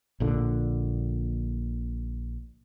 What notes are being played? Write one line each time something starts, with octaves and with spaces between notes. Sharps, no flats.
A#1 A#2 D3